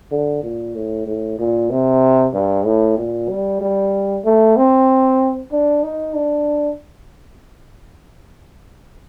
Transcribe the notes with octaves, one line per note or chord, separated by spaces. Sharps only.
D3
A#2
A2
A2
A#2
C3
G2
A2
A#2
G3
G3
A3
C4
D4
D#4
D4